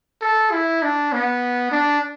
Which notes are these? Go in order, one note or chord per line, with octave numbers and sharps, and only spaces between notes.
A4
E4
D4
B3
D4